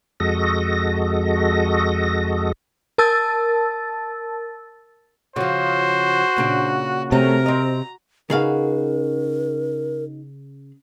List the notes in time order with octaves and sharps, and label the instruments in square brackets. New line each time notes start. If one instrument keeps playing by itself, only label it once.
[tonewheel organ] F2 G#3 F#4 A4 D#5 A#6
[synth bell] A#4 A5 E6 A6
[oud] C#3 F3 [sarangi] F#4 [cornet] C5
[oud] A#2 C#3 D4
[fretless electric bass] C3 [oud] A3 C#4 [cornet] A#4 [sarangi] A#5
[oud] C4 D#5
[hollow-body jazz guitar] C#3 G#4 F5 [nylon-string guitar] D#4 F#4 B4 [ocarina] A#4